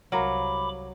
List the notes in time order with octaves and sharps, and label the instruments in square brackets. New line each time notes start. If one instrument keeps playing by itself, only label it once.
[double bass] C2 [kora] F#3 [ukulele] A#4 F5 A#5 [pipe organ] B5 D6